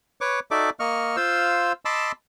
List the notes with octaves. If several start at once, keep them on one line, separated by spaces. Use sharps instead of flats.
B4 C#5 C#6 D6
D#4 F#4 A4 D5 E5 D6
A#3 D#5 C#6 F6
F4 C5 F5 E6
D#5 A5 B5 C6 D6 E6